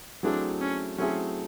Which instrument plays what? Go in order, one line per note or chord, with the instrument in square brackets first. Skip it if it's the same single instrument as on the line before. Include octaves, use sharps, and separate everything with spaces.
[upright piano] F#3 A3 C4 E4 G#4 [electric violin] D4
[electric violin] C#4
[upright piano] F#3 A3 C4 E4 G#4 [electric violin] C#4